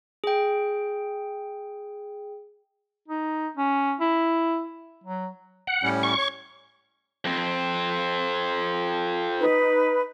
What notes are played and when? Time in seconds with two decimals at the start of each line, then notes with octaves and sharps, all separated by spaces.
0.24 G#4 G5
3.08 D#4
3.57 C#4
4.00 E4
5.04 F#3
5.67 F#5
5.83 A2 G3 C#4
6.03 C#6
6.18 C#5
7.25 F2 C4
9.40 D#4 B4